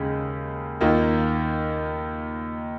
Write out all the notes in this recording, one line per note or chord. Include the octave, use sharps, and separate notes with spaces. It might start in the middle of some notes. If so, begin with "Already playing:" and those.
Already playing: D#2 C#3 G#3
D#2 D#3 A#3 F4